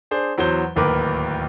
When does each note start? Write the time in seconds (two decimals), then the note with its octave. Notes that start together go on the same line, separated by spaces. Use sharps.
0.11 D4 G#4 C5
0.38 E2 F#3 C5 G7
0.76 D1 D#2 A#4 B4 D6